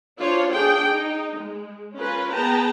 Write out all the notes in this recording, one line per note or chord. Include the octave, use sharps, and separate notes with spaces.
D4 F4 C5 C#5
D4 G#4 G5
D#4
G#3
C#4 F4 A#4 B4
B3 G#4 B4 G5 A5 A#5